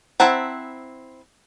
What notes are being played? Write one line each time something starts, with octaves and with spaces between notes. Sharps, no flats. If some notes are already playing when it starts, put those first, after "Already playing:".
C4 E4 F#5 A5 A#5